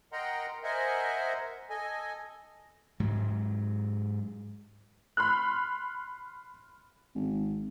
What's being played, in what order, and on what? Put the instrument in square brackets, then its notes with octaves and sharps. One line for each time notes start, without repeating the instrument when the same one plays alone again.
[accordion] A#4 D#5 F#5 G5 A#5 C6
A#4 C5 D#5 E5 F#5 G#5
A4 D#5 G#5
[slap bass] G#2 F#3
[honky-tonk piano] B5 C6 F6 F#6
[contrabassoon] G#1